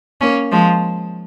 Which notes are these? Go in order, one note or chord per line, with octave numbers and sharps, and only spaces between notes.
A#3 C#4
F3 G#3